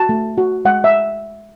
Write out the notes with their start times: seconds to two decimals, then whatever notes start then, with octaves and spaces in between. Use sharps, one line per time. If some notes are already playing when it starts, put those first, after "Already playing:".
Already playing: F#4 A5
0.09 A3
0.38 F#4
0.65 G#3 F#5
0.84 E5